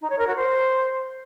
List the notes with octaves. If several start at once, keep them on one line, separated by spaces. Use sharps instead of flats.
D#4
C#5
A#4
F#4
C5